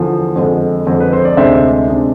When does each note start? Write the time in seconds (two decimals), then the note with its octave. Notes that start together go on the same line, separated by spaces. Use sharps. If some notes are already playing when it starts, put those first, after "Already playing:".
Already playing: E2 D3 F3
0.36 F2 D3 G#3
0.87 F2 D3 G#3
1.00 B4
1.13 C5
1.25 D5
1.37 D2 C3 G#3 D4 C5 E5
1.88 C3 G#3 D4